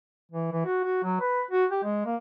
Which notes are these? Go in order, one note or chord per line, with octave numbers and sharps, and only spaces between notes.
E3
E3
F#4
F#4
F#3
B4
F#4
G4
G#3
A#3